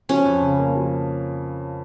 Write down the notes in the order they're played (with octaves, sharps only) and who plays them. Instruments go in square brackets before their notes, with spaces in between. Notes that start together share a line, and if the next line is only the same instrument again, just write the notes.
[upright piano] F3 [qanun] C#4
[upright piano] F2
C#3
A#3
F3